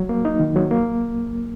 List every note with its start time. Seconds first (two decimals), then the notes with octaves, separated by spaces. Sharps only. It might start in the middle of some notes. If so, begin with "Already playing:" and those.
Already playing: F#3
0.09 A#3
0.25 D#4
0.40 D#3
0.56 F#3
0.71 A#3